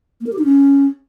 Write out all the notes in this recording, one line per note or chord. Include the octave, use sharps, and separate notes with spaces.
A#3
A#4
G4
D#4
C#4